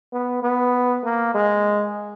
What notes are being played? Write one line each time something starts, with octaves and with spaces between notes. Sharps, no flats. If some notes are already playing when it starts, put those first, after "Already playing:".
B3
B3
A#3
G#3